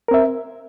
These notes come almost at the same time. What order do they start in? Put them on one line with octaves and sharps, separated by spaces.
A#4 C4 E5